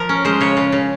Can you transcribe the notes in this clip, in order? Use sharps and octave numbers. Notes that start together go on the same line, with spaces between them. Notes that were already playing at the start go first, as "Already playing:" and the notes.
Already playing: F3 A#4
C#4
G#3 C5
C#3 C#5
C#3
C#3